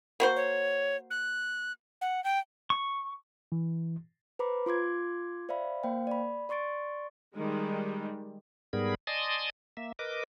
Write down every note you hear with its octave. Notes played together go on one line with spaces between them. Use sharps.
A#3 F#4 C5
C#5
F#6
F#5
G5
C#6
E3
B4 C5 A#5 B5 D6
F4 C6 D6 G#6
C5 D5 E5 F5 B5
A#3 C5 F5 G5
D5 B5
D5 C6 C#6 A6 D7
D#3 G3 G#3
G#2 G3 B3 G#4 A#4 B5
D5 D#5 G#5 A5 C6 D#6
A#3 E5
A#4 B4 D#5 D6